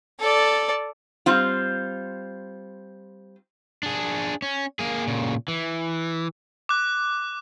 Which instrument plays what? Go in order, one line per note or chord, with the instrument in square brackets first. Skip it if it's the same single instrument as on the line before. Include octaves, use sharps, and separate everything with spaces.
[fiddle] A4 D5
[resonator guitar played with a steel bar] G3 C4 F4
[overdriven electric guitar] D4 G#4
C#4
A#3 G#4
A#2 C#3
E3
[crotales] D6 F#6